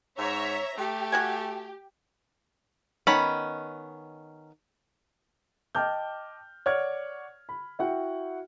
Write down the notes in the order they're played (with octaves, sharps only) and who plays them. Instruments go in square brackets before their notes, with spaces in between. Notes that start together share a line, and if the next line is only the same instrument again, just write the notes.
[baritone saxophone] G#2 [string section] C#5 E5 A#5
[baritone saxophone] A3 [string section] G4
[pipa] F#4 F#5 G#5
[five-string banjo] D#3 B3 C#4 B5
[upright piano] D#5 G5 A5 D6 F6 G6
C#5 D5 F#5 F6 G#6
B5
E4 F#4 F#5 G5